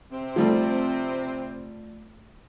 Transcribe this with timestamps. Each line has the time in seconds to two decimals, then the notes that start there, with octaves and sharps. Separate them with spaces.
0.12 C3 C4
0.36 F3 G3 A3